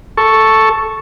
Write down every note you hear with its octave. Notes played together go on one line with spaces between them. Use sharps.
A4 C#6